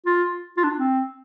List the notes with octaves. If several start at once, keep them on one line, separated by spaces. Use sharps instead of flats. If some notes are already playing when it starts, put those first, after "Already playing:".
F4
F4
D4
C4